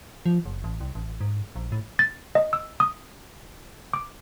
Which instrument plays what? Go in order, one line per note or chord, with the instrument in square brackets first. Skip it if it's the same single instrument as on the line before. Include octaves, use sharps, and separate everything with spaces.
[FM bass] F3
F#1
A1
C2
A1
G#2
A#1
A2
[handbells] A6
D#5
E6
D#6
D6